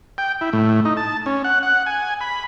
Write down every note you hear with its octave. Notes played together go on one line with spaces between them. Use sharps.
G5
E4
A2
D#4
A5
C#4
F#5
F#5
G#5
B5